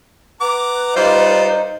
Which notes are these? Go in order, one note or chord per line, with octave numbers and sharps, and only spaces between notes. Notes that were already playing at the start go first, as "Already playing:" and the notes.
B4 F#5 A#5 D6
G3 D#4 F4 C5 D5